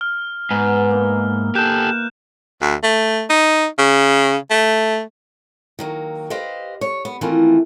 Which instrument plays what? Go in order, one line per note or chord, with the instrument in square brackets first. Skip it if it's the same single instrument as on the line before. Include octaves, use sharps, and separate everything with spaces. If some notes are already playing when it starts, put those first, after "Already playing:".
[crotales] F6
[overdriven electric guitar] G#2 [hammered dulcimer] B3
[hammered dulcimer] A#3 E4
[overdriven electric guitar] G4 A4 [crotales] F#6 G6 E7
[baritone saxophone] D2
A3
D#4
C#3
A3
[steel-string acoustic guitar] D#3 F#3 A#3
G4 B4 C5 D#5 F5
C#5
B3
D#3 E3 A3 A#3 C4 F4